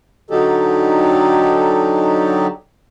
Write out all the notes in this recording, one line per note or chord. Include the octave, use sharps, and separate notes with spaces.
D3 F#3 D#4 G4 A4